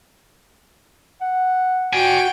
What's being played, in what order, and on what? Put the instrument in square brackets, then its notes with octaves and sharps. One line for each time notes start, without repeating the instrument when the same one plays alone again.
[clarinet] F#5
[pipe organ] F#4 [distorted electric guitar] D5 G#5 [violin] G5 D7